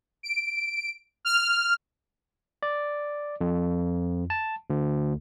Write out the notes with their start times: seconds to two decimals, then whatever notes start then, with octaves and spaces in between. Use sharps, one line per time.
0.23 D7
1.25 F6
2.63 D5
3.41 F2
4.30 A5
4.70 D2